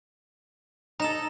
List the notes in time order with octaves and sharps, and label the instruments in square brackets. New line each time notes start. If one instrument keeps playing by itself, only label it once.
[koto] D#4 A4 [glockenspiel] A#5 E7